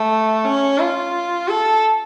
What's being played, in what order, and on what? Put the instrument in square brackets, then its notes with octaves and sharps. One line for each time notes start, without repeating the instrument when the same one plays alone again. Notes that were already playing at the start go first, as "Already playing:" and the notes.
Already playing: [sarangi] A3
C#4
F4
A4